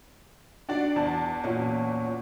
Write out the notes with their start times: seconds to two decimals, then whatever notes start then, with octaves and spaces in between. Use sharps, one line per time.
0.69 D4 F#4 D5
0.96 E2 A5
1.44 A#2 C#4 F#4